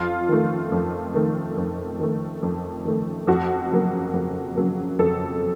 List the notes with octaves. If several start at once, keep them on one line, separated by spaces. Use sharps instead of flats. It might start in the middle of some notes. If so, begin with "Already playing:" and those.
Already playing: F2 F4
D#3 A3
F2
D#3 A3
F2
D#3 A3
F2
D#3 A3
F2 F#4
C#3 F#3 A#3
F2
C#3 F#3 A#3
F2 A4